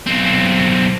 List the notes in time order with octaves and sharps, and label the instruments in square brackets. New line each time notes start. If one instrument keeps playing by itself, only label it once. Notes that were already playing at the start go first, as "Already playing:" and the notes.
[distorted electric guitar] B1 C4